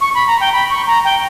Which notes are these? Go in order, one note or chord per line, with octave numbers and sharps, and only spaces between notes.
C#6
B5
A#5
G5
B5
C#6
A#5
G5